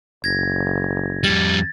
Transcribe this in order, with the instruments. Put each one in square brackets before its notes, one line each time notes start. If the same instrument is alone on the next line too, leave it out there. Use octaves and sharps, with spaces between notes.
[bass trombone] F#1 [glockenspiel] G#6 A#6
[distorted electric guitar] F2 G3 [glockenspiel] A6